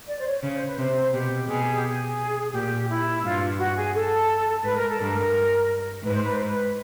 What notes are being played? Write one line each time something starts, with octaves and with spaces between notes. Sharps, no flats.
D5
C5
C#5
C#3 C#5
C5
B4
C3 C5
B2 G4
B2 G#4
G4
G#4
A#2 G4
E4
G2 F4
F#4
G#4
A4
G#2 B4
A#4
A4
G2 A#4
G#2 B4
C5
B4
C5
B4